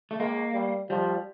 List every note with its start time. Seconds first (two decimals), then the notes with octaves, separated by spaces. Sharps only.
0.11 A3
0.19 G#3 A#3
0.54 G3
0.90 F3 G3